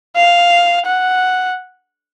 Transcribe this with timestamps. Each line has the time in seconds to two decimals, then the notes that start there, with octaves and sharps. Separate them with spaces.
0.16 F5
0.86 F#5